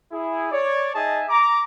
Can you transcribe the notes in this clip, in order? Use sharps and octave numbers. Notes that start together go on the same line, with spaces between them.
E4 G#4
C#5 D5
D#4 G#4 D#5 E5 G#5 A5
A#5 D6